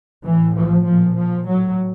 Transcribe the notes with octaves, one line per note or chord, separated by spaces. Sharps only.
A2 E3
F3
A#2 F3
F3
A2 F#3